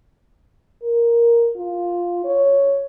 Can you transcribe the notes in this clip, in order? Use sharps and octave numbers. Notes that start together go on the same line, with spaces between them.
A#4
F4
C#5